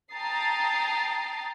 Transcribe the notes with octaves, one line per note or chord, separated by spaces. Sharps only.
G5 A5 A#5 D#6 A6 C7